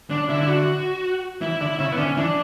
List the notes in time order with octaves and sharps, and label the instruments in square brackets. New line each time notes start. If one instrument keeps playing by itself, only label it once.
[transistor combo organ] D3 [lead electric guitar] D4
[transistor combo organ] D3 [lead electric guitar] E4
[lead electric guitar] E4
F#4
[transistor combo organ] E3 [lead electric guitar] E4
[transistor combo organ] D3 [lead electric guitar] E4
[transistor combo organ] C#3 [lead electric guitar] E4
[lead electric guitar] B3
[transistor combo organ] D3 [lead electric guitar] C#4
[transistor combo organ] E3 [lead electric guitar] D4